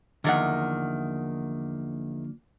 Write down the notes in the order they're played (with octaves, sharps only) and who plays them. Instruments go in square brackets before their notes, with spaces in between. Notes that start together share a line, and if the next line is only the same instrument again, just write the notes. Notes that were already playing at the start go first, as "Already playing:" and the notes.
[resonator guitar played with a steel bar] E2 D#3 F#5 [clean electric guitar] D3 F3 A#3